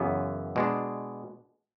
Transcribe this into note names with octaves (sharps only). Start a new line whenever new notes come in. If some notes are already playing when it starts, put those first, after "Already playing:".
Already playing: F#2 C#3 E3 B3
B2 G#3 D4